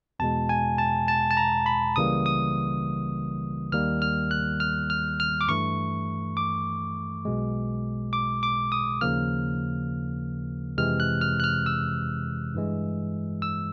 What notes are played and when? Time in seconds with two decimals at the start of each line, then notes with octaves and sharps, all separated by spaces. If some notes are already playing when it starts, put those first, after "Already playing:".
0.19 E2 B2 G#3 A5
0.49 G#5
0.78 A5
1.08 A5
1.31 A5
1.37 A#5
1.66 B5
1.96 C#2 C#3 E3 G3 A#3 D#6
2.26 D#6
3.72 D#2 D#3 G3 A#3 F6
4.02 F6
4.31 F#6
4.60 F6
4.90 F6
5.20 F6
5.41 D6
5.48 G2 E3 A3 C#6
6.37 D6
7.25 B1 B2 G#3
8.13 D6
8.43 D6
8.72 D#6
9.01 D#2 C#3 F3 A#3 F6
10.78 F2 C3 E3 G#3 F6
11.00 F#6
11.21 F6
11.40 F#6
11.44 F6
11.66 E6
12.54 G2 E3 G#3
13.42 E6